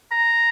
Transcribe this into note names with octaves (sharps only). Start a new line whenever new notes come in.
A#5